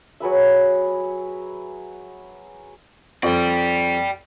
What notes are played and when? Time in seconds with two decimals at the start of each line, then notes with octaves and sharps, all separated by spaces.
0.20 F#3 G#4 B4 E5
3.23 F2 D5 G5